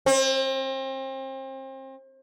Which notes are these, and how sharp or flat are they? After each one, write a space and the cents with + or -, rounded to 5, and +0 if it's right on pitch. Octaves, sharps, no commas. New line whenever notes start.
C4 +35